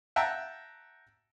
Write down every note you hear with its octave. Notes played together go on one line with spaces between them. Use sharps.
E5 F#5 G5 A5 A#5